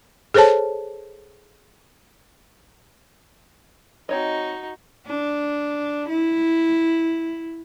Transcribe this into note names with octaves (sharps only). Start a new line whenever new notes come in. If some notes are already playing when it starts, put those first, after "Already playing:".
G#4 A4 C5 C#5 A5
C4 D#4 F#4 C#5 D#5
D4
E4